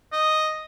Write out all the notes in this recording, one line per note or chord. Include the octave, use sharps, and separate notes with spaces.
D#5